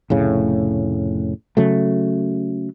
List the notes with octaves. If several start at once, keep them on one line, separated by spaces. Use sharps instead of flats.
F1 A2 C#3
C#3 F#3 A3